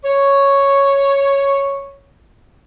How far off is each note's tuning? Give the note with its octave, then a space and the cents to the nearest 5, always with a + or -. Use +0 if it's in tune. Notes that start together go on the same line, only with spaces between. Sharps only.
C#5 +0